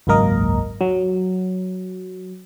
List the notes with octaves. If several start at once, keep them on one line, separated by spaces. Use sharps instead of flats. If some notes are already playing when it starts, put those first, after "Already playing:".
G#1 C#2 F#2 A#3 A#4 D#5
F#3